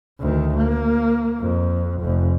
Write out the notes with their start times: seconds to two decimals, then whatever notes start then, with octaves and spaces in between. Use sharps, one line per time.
0.20 D2 D#3
0.57 A#3
1.41 F2
2.01 F1 F2